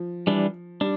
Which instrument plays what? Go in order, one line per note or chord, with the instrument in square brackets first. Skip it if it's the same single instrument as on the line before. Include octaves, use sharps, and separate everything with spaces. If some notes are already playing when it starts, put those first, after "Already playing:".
Already playing: [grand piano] F3
[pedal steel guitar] E3 G3 D4
[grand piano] G3 [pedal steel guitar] D4